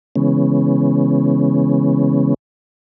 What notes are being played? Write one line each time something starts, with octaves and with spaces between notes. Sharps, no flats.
C#3 E3 G#3 B3 C#4